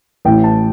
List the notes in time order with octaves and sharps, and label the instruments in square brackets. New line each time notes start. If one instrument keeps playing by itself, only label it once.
[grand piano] A1 A2 E3 G5
A5